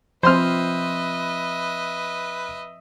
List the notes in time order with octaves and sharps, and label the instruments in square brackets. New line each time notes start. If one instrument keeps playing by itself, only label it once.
[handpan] F3 C4 [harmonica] B4 [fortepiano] C5 C6 F6 [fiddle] D#5 E5